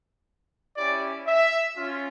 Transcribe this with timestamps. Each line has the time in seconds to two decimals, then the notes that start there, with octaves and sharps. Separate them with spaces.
0.76 C#4 E4 G4 D5
1.26 E5
1.76 C#4 F4